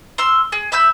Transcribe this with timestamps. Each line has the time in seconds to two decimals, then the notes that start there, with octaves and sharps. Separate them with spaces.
0.18 C6 E6 F6
0.52 G#4
0.72 E5 B5 E6 G6